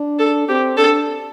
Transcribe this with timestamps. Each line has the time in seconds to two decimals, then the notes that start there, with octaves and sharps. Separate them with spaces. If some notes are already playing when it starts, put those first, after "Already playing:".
Already playing: D4
0.19 A4
0.49 C4 G4
0.77 D4 A4